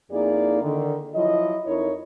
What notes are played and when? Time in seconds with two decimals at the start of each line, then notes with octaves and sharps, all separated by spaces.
0.11 F2 A#3 D#4 E4 G#4 D5
0.62 D3 D#3
1.15 F3 F#3 E4 D#5
1.66 F2 D#4 E4 A#4 C#5